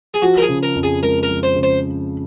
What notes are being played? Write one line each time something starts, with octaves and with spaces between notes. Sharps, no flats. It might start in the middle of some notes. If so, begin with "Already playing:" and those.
G#4
F3 F#4
A#4
G#4
C#3
A#4
F2
G#4
G#3 A#4
A#4
F3
C5
C#3
C5